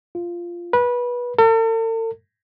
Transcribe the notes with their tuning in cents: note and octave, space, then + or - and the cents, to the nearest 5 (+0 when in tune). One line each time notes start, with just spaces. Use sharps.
F4 -10
B4 -20
A4 +45